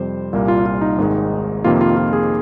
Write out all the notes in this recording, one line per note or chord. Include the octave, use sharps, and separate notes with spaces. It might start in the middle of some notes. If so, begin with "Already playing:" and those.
Already playing: F2 C3 G3 C5
C2 A#2 G3 A#3
F4
F4
D#4
G#1 G#2 D#3 G#3
F2 C3 D#3 A#3 F4
F4
F4
G#4